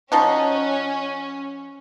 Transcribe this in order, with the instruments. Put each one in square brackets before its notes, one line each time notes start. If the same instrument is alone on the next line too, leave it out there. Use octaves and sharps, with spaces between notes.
[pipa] F3 D#4 F#4 [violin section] C#4